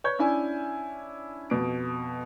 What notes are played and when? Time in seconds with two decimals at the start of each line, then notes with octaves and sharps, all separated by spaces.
0.04 B4 C#5 G6
0.19 C#4 D4 E4 G#5
1.50 F2 B2 D7